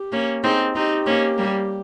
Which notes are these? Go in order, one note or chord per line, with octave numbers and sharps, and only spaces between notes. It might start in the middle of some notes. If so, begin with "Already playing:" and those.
Already playing: G4
A#3 C#4
C4 D#4 G#4
C4 D#4 G4
A#3 C#4
G3 A#3